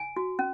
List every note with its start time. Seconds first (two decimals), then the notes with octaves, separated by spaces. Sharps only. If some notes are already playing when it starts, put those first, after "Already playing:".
Already playing: G#5
0.16 F#4
0.39 C#4